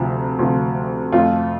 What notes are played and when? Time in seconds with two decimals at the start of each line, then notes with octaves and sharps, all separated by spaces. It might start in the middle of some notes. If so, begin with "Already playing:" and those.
Already playing: D2 C3 F3
0.39 D2 C3 F3
1.12 F2 F3 A3 F4